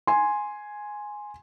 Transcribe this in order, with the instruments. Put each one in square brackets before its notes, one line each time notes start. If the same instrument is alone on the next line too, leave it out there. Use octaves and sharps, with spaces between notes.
[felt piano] G#5 C6